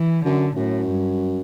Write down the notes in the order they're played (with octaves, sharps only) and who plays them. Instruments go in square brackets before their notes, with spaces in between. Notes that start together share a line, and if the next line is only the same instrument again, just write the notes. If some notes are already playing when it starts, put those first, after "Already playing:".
Already playing: [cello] E3
[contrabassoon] F#2 [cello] D3
[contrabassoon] F#2 [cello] A2
[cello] G2